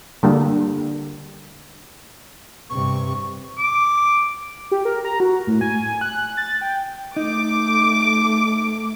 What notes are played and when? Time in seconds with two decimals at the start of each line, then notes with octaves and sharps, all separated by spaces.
0.23 D3 G3 A#3
2.70 G2 C3 C#6
3.58 D6
4.71 G4
4.85 A#4
5.05 A#5
5.20 F#4
5.47 A2
5.61 G#5
6.01 F#6
6.37 A6
6.61 G5
7.16 A3 D#4 D6